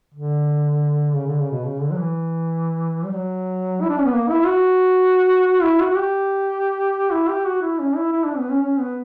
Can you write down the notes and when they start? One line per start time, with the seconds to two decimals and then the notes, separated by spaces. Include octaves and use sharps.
0.14 D3
1.14 C#3
1.26 D3
1.39 C#3
1.51 B2
1.64 C#3
1.81 D3
1.91 F#3
1.98 E3
3.05 G3
3.14 F#3
3.82 E4
3.89 D4
3.98 C#4
4.05 B3
4.14 A#3
4.30 E4
4.46 F#4
5.62 E4
5.80 F#4
5.90 F#4
5.96 G4
7.12 E4
7.29 G4
7.46 F#4
7.62 E4
7.79 C#4
7.96 E4
8.12 E4
8.25 D4
8.38 B3
8.50 C#4
8.62 C#4
8.79 B3